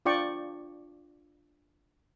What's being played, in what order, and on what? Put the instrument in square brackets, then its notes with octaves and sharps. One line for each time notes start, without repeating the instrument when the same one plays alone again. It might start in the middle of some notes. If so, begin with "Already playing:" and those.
[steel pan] D4 F4 D5 G5 C#6